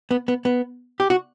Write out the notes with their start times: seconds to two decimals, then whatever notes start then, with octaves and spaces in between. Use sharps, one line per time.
0.11 B3
0.28 B3
0.45 B3
1.00 G4
1.10 F#4